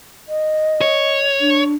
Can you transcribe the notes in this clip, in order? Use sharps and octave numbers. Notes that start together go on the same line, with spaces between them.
D#5
C#5
D4